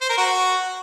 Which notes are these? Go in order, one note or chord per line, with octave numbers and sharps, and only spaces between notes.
C5
A#4
F#4